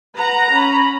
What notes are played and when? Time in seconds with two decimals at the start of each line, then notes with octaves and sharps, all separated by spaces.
0.16 B4 F#5 A#5
0.51 C#4 B5